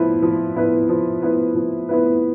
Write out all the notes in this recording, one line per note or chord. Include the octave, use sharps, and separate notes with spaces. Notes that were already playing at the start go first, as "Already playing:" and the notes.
Already playing: F3 B3 E4 B4
F3
B3 E4 B4
F3
B3 E4 B4
F3
B3 E4 B4